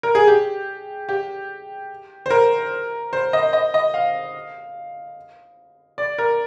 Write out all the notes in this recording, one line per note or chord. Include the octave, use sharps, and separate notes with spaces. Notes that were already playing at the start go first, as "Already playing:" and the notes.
A#4
G#4
G4
G4
C5
A#4
C5
D#5
D#5
D#5
F5
D5
A#4